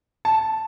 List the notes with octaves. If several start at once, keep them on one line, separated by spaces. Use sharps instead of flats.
A5